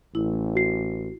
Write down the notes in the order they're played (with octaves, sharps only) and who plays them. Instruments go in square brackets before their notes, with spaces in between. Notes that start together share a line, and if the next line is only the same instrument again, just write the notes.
[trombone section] A1 [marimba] E4
[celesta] F#4 C7